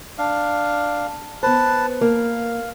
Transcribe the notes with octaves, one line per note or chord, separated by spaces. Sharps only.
D4 F5
B3 B4 C5 A5
A#3 F5